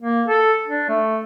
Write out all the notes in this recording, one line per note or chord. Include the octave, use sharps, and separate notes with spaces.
A#3
A4
D4
A3